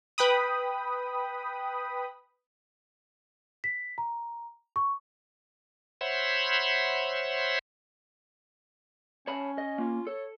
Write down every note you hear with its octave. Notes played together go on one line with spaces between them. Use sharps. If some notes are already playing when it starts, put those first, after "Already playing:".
B4 G5 B5 D#6
B6
A#5
C#6
C5 C#5 E5 F#5 B5 C6
C#4 C#5 A5 B5
D#5
A#3 F4
A4 C#5